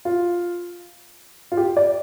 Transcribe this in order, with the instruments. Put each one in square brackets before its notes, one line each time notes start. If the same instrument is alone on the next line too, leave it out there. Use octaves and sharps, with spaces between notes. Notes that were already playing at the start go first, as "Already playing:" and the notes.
[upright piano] F4
F4
G4
D5